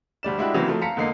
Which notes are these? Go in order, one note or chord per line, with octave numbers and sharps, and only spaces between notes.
D2 G3 D5 E7
G#3 D4 E4 F#4 G4
C#3 E3 F#3 A#3 C4
F3 F#3 A3
F5 A5 A#5 B6 C#7
E2 D3 G#3 A#3 D#5 C7